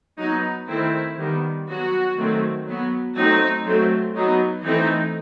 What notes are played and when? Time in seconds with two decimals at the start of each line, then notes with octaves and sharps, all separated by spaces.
0.18 F#3 B3 D#4
0.68 D#3 A3 C4 E4
1.18 D#3 G3 B3
1.67 F#3 B3 F#4
2.17 D#3 F#3 A3 C4
2.67 F#3 B3
3.16 F#3 A3 C4 D#4
3.66 F#3 A3 C4
4.15 F#3 B3 D#4
4.64 E3 A3 C4 D#4